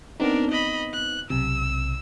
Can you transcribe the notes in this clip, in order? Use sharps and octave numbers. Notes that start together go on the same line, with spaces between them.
B3 C4 D4 D#4 A#4
D#5 B5
F#6
B1 C3 E6